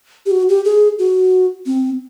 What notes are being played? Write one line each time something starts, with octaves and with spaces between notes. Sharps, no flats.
G4
F#4
G4
G#4
F#4
C4